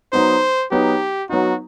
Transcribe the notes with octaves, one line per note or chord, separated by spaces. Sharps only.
F#3 B3 D#4 C5
F#3 B3 D#4 G4
F#3 B3 D#4 F#4